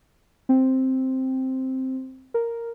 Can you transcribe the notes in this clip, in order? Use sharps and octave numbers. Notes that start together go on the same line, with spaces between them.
C4
A#4